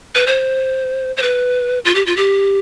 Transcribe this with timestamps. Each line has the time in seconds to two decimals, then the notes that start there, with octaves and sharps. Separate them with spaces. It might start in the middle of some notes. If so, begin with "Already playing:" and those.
0.15 B4
0.27 C5
1.17 C5
1.22 B4
1.85 F4
1.95 G4
2.06 F4
2.17 G4